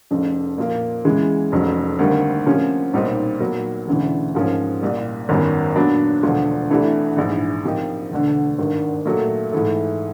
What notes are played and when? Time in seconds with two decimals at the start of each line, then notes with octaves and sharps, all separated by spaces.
0.11 F1 F2 C#3
0.58 A#2 F3 A#3
1.05 E2 C#3 E3 G#3
1.52 F1 F2 C#3 F#3
1.99 D2 C3 D#3 G3 A#3
2.46 C3 F3 A#3 C#4
2.93 B1 A#2 G3 C4 D#4
3.40 A#2 F#3 B3
3.87 E1 D2 C#3 E3
4.35 G#2 F3 A#3 C#4
4.81 C2 A#2 G3
5.29 G#1 F#2 D#3 G3 B3
5.76 A#2 F#3 B3 D4
6.23 E1 D2 D3 F3
6.70 C2 C3 E3 A3 D4
7.17 A#1 G#2 E3
7.65 C3 F3 A#3 D#4 G4
8.11 E1 D2 D3
8.59 G#1 G2 D#3
9.05 A#2 F#3 A3
9.52 G#2 E3 A3